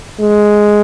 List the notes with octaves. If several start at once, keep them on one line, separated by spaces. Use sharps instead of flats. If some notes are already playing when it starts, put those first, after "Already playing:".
G#3